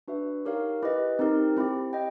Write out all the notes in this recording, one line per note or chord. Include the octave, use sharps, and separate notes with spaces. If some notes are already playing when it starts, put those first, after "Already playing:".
D4 F#4 B4 E5
D#4 G4 A#4 C#5 F5
E4 G4 B4 D#5
C4 D#4 G4 A#4
C4 E4 G4
D#5 G5